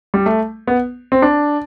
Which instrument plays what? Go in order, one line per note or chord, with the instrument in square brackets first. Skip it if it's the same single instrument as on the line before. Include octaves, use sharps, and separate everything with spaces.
[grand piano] G3
A3
B3
C4
D4